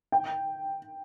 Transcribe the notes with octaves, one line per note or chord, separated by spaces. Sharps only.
G5